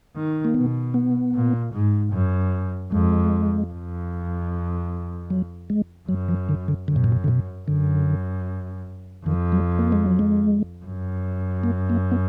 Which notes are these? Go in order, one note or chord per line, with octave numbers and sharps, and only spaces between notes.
D#3
A#3
B2 B3
B3
A#2
G#2
F#2
F2 G#3
F2
F#3
G#3
F#2 F#3
F3
D3
D3
F#2 D3
B2
A#2
B2
D3
B2
F#2 D3
F2 D#3
F#3
A#3
G#3
F#3
G#3
F#2
A#3
A#3
B3